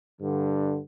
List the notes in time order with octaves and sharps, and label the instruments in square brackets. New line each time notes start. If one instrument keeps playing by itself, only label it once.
[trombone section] G2 D3